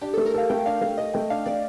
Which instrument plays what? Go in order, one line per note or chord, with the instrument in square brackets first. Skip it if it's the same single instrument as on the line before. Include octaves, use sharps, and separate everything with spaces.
[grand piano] D4 [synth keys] G4
[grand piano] A3 [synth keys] A4
[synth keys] A#4
[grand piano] A4 [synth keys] F5
[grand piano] A3 [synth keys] G5
[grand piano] D4 [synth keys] F5
[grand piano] A3 [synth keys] F5
[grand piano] A4 [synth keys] D#5
[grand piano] A3 [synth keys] G5
[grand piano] D4 [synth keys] F5
[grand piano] A3 [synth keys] D5